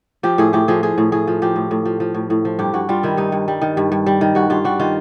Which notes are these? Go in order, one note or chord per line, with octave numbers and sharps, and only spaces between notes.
F3 G4
A2 G#4
A2 G4
F3 G#4
F3 G#4
A2
A2 G#4
F3
F3 G4
A2
A2
F3
F3
A2
A2
F3
G2 G4
G2 F#4
G3 F4
D#3 E4
G2 D#4
G2
G3
D#3
G2
G2
G3
D#3
G2 F#4
G2 F4
G3 F#4
D#3 F4